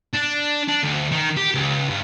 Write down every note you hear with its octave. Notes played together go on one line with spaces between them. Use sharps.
D4
D4
D2
D#3
G4
C#2
G2